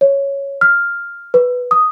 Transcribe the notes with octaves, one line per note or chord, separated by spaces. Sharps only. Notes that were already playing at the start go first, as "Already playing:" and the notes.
C#5
F6
B4
D#6